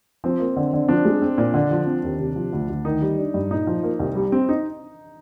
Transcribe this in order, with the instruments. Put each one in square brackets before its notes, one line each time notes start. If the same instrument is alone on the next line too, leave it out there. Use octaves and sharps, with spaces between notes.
[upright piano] F3 [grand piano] C4
[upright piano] A#3
D3
D3
[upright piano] F3 [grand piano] D4
[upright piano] G#3
C4
A#2
D3
F3
C4
D#2
C3
F3
D2
D2
[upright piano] D#3 [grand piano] D#4
[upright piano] G3
D4
G2
[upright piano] A#2 [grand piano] D#4
[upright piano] F3
A#3
C2
G3
C4
D#4